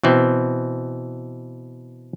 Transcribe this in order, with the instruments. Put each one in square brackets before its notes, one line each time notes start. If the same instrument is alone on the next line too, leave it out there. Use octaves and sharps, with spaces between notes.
[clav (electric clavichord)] B2 E3 C4